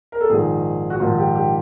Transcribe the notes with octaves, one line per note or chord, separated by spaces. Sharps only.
A#4
A4
A#1 G#2 D#3 G#4
F#4
A#1 G#2 D#3 F4
G4
G4